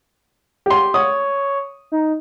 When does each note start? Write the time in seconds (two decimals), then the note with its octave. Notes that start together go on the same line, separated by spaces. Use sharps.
0.66 G4 C6
0.94 C#5 D#6
1.92 D#4